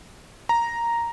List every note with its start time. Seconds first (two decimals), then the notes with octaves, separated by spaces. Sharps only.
0.49 A#5